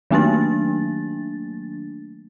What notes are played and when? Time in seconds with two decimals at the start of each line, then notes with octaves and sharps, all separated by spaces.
0.11 D#3 F#3 A3 A#3 D4 A6